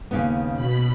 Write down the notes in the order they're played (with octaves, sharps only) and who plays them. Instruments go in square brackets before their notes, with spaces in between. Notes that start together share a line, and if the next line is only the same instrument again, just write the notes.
[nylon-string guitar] D#2 C#3 B3
[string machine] B2 B5